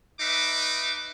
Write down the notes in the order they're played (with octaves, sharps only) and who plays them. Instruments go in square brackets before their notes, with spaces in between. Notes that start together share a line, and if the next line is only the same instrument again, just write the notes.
[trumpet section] D#4 B4 E5 D6